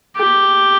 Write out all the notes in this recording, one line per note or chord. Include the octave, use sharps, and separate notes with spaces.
G4